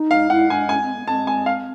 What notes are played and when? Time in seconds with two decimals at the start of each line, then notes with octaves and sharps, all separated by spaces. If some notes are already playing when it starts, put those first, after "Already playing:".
Already playing: D#4
0.11 F5
0.30 E4 F#5
0.50 D4 G#5
0.69 C#4 G#5
0.82 C4
0.95 B3
1.08 C4 A5
1.27 G#5
1.46 F5